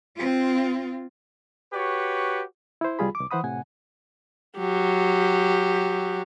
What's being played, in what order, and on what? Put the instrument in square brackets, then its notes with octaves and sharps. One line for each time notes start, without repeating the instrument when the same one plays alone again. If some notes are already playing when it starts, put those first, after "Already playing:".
[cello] C4 F4
[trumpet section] F#4 G4 B4 C#5
[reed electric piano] E4 C5
C2 G3 F4 G#4 B5
C2 D6
E3 C5 F#5 B5 D#6
A2 C3 F#5 G#5
[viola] F#3 G4